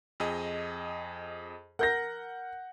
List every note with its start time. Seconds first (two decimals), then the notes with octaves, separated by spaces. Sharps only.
0.20 F2 G#4 D#5
1.79 A#4 F#5 G6 A#6